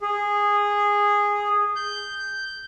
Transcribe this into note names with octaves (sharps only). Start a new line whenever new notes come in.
G#4
G6